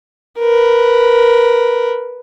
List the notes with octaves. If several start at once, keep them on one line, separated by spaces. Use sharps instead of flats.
A#4 B4